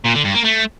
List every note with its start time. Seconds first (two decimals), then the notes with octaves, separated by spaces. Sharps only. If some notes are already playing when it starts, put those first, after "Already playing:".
0.04 A#2
0.14 D3
0.24 G2
0.34 A#3
0.44 A3